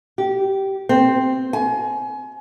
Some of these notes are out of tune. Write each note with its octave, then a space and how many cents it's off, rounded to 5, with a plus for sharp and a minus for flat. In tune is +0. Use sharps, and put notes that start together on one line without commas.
G4 -15
C4 +0
G#5 +30